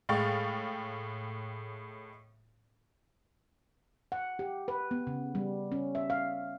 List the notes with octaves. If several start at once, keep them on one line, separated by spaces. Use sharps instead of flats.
A2 G#3 F5 G5 C#6 A6
F#5
G4
B4
B3
C#3
G3
C#4
E5
F5